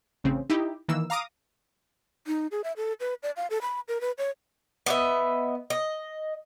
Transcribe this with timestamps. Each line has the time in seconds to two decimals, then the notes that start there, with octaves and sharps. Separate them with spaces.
0.24 A1 C#3 C4
0.50 D#4 E4 G4
0.88 D#3 E3 A#3 E6
1.10 F5 A#5 D6 D#6
2.27 D#4
2.51 G#4
2.64 E5
2.77 A4
3.00 B4
3.23 D5
3.36 F5
3.50 A4
3.62 B5
3.88 A#4
4.01 B4
4.18 C#5
4.86 B3 D#5 E5
5.70 D#5